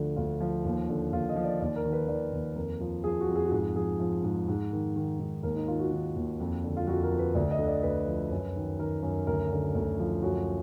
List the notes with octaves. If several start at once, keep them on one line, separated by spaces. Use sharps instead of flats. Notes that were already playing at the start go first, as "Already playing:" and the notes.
Already playing: D2 D3 F3
D2 F4
F3
D#2
D3
D#2 F4
D#5
F3
D5
D#2 D5
A#4
D#3
B4
D#3 D5
D#2
F2 A#4
F3
F3 G#4
F#4
F2
G#4
F#4
G#2 G#4
F3 G#4
F3
G#2
G#2
D#3
D#3
G#2
D#2 A#4
D#4
D#3 F4
F#4
D#3
D#2
F2
D3
F4
F2 F#4
A#4
F3
B4
D2 D5
D#5
D3
D5
D2 B4
F3
F#2
D#3
D#3 A#4
F#2
D2 A#4
D3
D2
F3
F#2 F#4